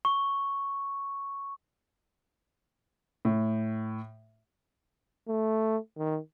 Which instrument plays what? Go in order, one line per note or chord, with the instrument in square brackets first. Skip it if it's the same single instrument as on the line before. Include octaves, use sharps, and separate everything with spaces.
[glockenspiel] C#6
[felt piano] A2
[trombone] A3
D#3